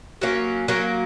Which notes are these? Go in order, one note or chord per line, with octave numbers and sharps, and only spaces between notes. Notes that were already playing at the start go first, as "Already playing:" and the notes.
F#3 A#3 C#4
F#3 A#3 C#4